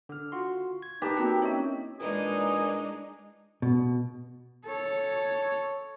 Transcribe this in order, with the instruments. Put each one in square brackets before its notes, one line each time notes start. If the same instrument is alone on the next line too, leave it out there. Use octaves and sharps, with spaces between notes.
[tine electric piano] D3 F6
F4 F#4 C6
G#6
[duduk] D#4 [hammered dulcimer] G4 [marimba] A#4 [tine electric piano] B4 A5 A#5
[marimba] A#3 D#4 F#4 [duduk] C4
[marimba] C#4 E4 [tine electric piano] C#5 D#5 E5
[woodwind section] A#2 E3 G#4 [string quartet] G#3 D4 D#4
[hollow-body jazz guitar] B2
[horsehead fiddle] A4 C#5